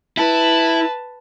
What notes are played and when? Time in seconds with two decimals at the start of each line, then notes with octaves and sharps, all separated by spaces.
0.17 E4 B4 A5